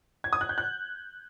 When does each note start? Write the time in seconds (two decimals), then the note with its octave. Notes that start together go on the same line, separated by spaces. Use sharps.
0.24 G#6
0.33 D#6
0.41 F#6
0.49 G6
0.58 F#6